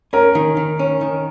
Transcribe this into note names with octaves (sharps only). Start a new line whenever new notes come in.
C#4 A#4
D#3
D#3
C#4
D#3